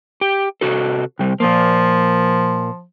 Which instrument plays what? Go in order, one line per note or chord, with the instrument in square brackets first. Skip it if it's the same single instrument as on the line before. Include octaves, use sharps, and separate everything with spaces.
[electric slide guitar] G4
C3 F#4 A4
C3 G3
[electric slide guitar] A#2 A#3 [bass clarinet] F3